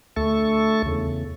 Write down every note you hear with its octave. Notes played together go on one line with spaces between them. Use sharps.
D2 A3 A4 C#6
E2 C#3